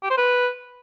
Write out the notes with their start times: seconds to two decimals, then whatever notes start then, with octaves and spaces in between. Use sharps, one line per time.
0.03 G4
0.10 C5
0.18 B4